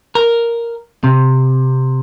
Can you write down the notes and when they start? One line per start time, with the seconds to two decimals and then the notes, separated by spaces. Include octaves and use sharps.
0.15 A#4
1.04 C3